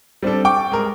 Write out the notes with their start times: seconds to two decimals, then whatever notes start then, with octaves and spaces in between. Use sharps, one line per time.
0.23 G3 C4 D4 A4
0.45 G5 C#6 D6
0.72 G#3 A#4